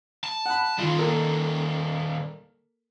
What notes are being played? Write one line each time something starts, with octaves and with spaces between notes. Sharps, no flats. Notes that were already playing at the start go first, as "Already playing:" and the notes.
A5
F#5 B5
D#3 G3 F4
A#3 A4 A#4